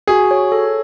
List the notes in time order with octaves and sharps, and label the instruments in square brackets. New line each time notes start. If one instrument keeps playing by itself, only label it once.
[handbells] F#4 [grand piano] G#4
[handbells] C#5
A4